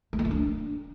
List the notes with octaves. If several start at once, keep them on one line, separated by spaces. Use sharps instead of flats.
A3
A#3
E4
D4